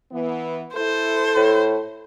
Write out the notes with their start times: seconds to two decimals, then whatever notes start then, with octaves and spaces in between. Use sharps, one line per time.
0.12 E3 B3
0.75 E4 A4 C5
1.36 A2